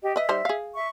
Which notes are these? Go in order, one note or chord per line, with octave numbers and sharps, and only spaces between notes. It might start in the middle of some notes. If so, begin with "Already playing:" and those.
G4 D#5
B4 D#5 E5
G3 D#4 C5
G#4 F5
E5 C#6